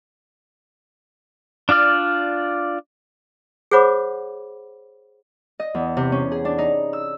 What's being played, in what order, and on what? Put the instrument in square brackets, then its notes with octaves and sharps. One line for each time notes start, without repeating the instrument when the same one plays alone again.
[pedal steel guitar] D4 F4 D5 F6
[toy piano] G#4 C5 C#5 F#5 B5 D6
[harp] D#5
E2
C3
C#4
G#4
D4
D#4
E6